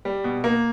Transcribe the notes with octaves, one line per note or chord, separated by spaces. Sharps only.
G3
B2
A#3